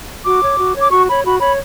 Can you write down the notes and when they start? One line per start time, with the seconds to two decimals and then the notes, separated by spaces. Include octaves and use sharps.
0.24 F#4 D6
0.41 C#5
0.57 F#4
0.75 C#5
0.82 D6
0.91 F#4 C#6
1.08 C#5 B5
1.25 F#4 B5
1.41 C#5 B5